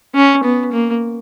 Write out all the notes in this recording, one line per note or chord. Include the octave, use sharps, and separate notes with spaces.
C#4
B3
A#3